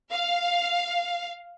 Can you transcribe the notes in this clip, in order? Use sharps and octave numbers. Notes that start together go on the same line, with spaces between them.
F5